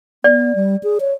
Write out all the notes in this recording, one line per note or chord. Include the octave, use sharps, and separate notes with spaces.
B3 D5
G3
G#4
C#5